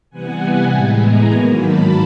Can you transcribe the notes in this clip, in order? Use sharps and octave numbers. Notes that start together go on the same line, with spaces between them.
C3 E3 G3 B3 F#5 G#5
A2 E3 G#3 B3 G5 A5
G#5 A#5
G#2 D#3 F#3 A#3 B5 C#6
A5 B5